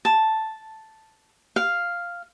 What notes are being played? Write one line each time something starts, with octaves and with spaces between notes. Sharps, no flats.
A5
F5